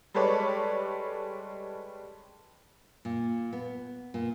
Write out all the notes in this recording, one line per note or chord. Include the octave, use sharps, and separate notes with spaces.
G3 G#3 A4 B4 C#5 D5
A#2
B3
A#2